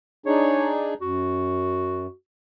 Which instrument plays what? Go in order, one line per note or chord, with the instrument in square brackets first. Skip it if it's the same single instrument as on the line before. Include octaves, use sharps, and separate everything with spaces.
[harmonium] D4 D#4 G#4 [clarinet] C#5
[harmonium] F#2 [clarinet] F#4